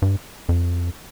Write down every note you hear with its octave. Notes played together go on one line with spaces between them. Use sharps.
G2
F2